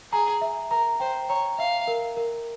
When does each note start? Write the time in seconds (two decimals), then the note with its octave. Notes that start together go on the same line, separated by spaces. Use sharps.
0.12 G#4 A#5
0.41 E5
0.71 A#4 A#5
1.00 C5 G5
1.29 C#5 A#5
1.58 E5 F5
1.87 A#4
2.17 A#4